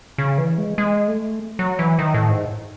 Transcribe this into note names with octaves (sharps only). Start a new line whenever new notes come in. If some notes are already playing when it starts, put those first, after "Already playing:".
C#3
E3
G#3
G#3
A3
F#3
E3
D#3
A2
G#2